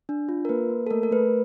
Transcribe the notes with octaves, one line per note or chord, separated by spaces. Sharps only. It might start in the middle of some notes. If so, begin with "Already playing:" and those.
D4
F4
A#4
A#3 B4
A#3
A4
A3 A#4
A#4
A3 B4